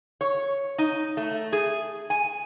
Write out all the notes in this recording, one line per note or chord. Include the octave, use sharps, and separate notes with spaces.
C#5
D#4
A3
G#4
G#5